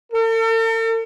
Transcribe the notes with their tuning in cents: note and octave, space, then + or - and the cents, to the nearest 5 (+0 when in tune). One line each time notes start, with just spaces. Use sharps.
A4 +45